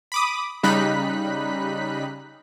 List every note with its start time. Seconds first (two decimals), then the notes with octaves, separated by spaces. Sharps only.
0.12 B5 D6 D#6
0.63 C#3 G3 D#4 B5 F#6 B6